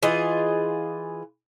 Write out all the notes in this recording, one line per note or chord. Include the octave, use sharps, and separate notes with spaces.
E3 F4 G#4 D#5